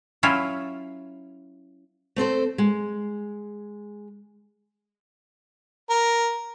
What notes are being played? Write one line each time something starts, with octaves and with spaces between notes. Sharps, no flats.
F#3 C#4 E4 F4
A3 C4 A4 C5
G#3
A#4